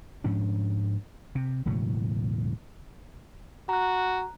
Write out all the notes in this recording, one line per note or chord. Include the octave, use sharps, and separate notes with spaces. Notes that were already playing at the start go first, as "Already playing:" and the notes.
G#2 F3 C#4 D4
C3
E1 A2 C#3 F#3
F#4 A#5 F#6